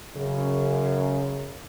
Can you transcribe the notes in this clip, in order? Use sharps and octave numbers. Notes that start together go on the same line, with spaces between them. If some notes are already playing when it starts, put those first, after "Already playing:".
F#2 C#3